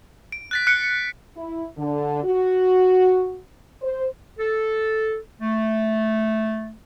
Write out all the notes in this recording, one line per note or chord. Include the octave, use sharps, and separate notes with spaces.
D7
F#6 A6 B6
F#6 C#7 D7
E4
D3
F#4
C5
A4
A3